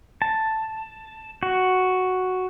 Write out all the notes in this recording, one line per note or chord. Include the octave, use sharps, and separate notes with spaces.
A5
F#4